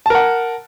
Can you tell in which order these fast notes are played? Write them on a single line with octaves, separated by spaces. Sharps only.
A5 A#4 F#5